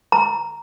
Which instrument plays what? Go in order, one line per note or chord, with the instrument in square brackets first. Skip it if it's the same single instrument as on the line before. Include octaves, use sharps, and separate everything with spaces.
[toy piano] A#5